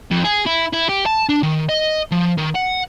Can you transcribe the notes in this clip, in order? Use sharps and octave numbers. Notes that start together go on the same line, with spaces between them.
F2
G#4
E4
E4
G4
A5
D4
D#3
D#5
F3
D#3
F#5